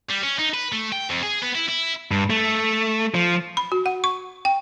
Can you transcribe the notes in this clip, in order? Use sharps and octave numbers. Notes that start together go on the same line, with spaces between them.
G3
C#4
D#4
B4
A3
G5
F2
G#4
B3
E4
E4
G2
A3
F3
B5
F#4
F#5
C#6
G5